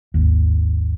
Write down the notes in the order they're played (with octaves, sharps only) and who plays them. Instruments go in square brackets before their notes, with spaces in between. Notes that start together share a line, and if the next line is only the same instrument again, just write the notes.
[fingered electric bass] G#1 D#2